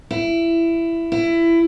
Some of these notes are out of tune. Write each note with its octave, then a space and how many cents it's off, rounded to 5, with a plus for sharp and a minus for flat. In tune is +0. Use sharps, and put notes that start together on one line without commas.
E4 +15
E4 +20